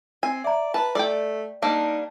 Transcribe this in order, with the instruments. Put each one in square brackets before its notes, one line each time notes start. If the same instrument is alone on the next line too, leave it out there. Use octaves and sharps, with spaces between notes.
[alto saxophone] C4 [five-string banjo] G#5
[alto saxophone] D5 [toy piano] E5 A#5
[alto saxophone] B4 [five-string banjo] A5
[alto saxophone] A3 [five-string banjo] D5 G5
[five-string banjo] G3 A#3 D4 [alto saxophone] D#4 [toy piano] A5